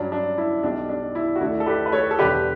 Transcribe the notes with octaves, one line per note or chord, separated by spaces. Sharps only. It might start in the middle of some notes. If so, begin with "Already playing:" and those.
Already playing: G2 F#3 C#4 D4
D4
E4
B1 B2 G3 D4
D4
E4
F#4
D2 D3 A3 D4 E4
A4
G4 B4
B4
A4 C#5
A4
E1 E2 D3 G3 G4 B4